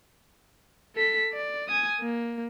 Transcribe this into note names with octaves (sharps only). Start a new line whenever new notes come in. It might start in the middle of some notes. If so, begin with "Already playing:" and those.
A4 B6
D5
G#5 D#6
A#3